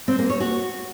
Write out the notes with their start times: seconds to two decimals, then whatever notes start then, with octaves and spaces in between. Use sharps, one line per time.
0.08 C4
0.19 A#3
0.29 C#5
0.40 F#4